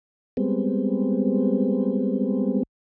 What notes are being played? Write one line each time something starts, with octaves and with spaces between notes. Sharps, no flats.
G3 G#3 B3 C4